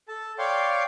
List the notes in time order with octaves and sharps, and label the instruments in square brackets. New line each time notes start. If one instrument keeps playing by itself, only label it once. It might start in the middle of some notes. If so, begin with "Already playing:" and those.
[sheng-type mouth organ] A4 A5
C#5 D5 F5 G5 C6